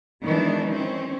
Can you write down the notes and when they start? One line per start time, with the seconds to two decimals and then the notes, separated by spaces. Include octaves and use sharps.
0.23 D#3 E3 F#3 G#3 B3 D4
0.70 C4 C#4